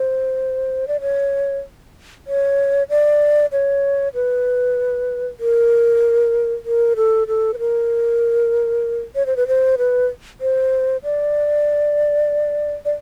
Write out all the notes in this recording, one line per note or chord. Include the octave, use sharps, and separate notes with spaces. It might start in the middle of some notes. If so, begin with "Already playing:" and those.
Already playing: C5
D5
C#5
C#5
D5
C#5
B4
A#4
A#4
A4
A4
B4
A#4
C#5
C5
B4
C5
B4
C5
D5
D5